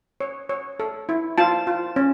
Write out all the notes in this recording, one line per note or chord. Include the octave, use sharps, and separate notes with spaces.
C#5
C#5
A4
E4
F4 A5
F4
C#4